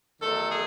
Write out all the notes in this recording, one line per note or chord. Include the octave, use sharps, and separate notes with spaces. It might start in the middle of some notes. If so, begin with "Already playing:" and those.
E2 D#3 F#3 A3 A4
G#4